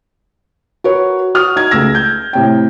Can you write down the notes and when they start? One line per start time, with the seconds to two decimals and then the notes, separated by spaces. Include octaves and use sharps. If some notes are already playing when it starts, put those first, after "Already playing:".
0.84 F#4 A#4 B4 C#5
1.35 F#4 D#6 F6
1.56 D#4 G#6
1.71 C#2 A3 E6 A#6
1.95 G6
2.33 A2 C3 G5